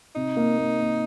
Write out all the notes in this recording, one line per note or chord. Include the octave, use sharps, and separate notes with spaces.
C3 D#4
A#3
A#3
A#3